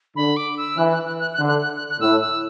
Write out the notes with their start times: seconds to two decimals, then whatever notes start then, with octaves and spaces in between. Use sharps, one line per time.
0.16 D3 B5
0.36 D6
0.57 E6
0.77 E3 F#6
0.92 F#6
1.06 F#6
1.19 F#6
1.34 F#6
1.39 D3
1.48 F#6
1.62 F#6
1.76 F#6
1.90 F#6
2.00 A2 E6
2.21 E6